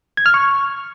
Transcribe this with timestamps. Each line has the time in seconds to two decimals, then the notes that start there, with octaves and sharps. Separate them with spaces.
0.17 G#6
0.26 F6
0.34 C#6